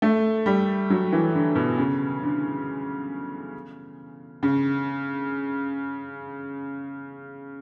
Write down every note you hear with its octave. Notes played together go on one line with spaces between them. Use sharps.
A3
G3
F#3
E3
D3
B2
C#3
D3
C#3